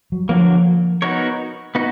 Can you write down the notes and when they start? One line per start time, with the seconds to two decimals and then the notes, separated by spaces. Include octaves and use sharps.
0.12 F#3
0.29 D3 F3 F#3 A#3
1.02 B3 D#4 F#4 A#4 C#5
1.75 B3 D#4 F#4